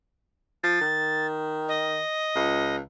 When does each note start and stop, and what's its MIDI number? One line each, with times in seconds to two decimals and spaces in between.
0.64 0.80 53
0.64 1.27 93
0.81 1.99 51
1.68 2.76 75
2.36 2.79 37